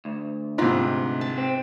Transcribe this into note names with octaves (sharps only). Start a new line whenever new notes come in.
D2
G#2 C3 D#4 F4 B4
A5
C4